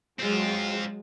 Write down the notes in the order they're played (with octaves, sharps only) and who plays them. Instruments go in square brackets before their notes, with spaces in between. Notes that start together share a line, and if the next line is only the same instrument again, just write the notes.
[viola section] F#3 G#3 [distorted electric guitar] C4 F4